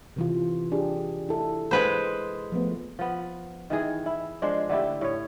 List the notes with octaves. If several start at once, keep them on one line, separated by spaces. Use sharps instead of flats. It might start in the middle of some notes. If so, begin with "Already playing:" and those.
C3 E3 F4
D4 G4 G#4
E4 A4
G#3 B4 C5
F3 A3 B3
F3 B3
D#3 E3 G#4
E4
F3 G#3 D4 C5
D3 A3 E4 G4
A2 C#5